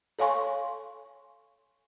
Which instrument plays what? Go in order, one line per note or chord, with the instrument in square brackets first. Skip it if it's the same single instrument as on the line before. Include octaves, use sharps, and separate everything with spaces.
[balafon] A4 C#5 F5 G#5 C6 C#6